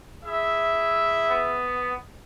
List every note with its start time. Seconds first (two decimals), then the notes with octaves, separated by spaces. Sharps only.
0.24 E4 G#4 E5
1.30 B3